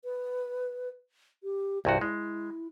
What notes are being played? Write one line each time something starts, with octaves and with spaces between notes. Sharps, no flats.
B4
G4
C2 G2 E4 F#4
G#3 E4